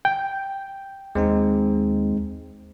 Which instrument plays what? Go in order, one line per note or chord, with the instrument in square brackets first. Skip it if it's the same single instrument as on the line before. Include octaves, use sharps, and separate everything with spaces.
[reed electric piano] G5
[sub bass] D#2 [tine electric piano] G#3 C4 D#4